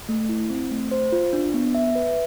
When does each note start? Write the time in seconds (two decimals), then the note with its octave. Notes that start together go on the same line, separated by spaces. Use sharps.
0.09 A3
0.29 E4
0.50 C4
0.71 A3
0.91 C5
1.12 F4
1.33 D4
1.54 B3
1.75 E5
1.95 B4